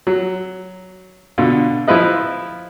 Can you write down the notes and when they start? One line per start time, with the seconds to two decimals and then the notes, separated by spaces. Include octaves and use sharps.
0.07 F#3
1.38 B2 D3 F4
1.88 F3 E4 F4 B4 D#5